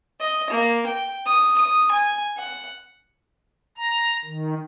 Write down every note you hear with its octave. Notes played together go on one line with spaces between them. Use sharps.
D#5
A#3
G5
D#6
D#6
G#5
F#5
A#5
D#3